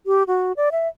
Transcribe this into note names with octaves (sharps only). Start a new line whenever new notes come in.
G4
F#4
D5
E5